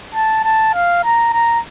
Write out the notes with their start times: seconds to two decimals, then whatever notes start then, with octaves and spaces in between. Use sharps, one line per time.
0.14 A5
0.44 A5
0.74 F5
1.04 A#5
1.33 A#5